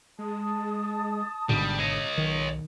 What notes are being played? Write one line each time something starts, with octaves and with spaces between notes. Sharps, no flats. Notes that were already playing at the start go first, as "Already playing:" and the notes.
G#3 A5 D#6
G#1 G#2 B2 D3 G3
C#5 D#5
B1 D#3